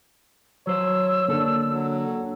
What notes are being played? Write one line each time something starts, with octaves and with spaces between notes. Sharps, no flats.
F#3 C5 C#5 E6
D3 A#3 D4 A4
F#3